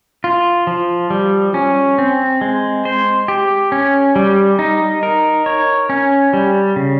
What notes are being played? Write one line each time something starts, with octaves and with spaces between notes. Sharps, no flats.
F4
F3
G3
C#4
C4
G#3
C5
G4
C#4
G3
D#4
A#4
C#5
C#4
G3
C#3